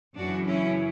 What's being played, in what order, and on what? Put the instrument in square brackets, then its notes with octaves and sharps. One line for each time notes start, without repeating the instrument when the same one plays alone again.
[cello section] F#2 C#3 E3 D4 F#4
C#4 E4